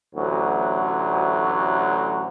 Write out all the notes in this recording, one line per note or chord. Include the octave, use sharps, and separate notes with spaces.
A1 D2 F#3 F#4